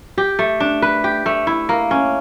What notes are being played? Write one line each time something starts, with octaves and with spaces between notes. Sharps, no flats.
G4
A3
D4
B4
G4
A3
E4
A#3
C#4